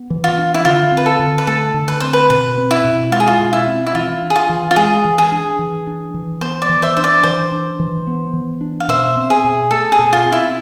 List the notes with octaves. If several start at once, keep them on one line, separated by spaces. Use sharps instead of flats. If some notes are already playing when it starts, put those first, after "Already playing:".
Already playing: B3
E3
F4
D4
E4
D3 F4
C4
B4
A4
D3
B4
A3 A4
D3
B4
C4 C5
B4
B2 B4
C4
E4
B2
G#3 F4
G#4
F4
B2
E4
C4
E4
E3 F4
D4
G#4
F4
E3
F4
G#3 G#4
E3
G#4
D4
E3
D4
E3
B3 C5
D5
E3
C5 E5
D4 C5
D5
E3 C5
D4
E3
B3
E3
D4
F5
B2 C5 E5
C4
G#4
B2
A3 A4
G#4
B2
F4
C4
E4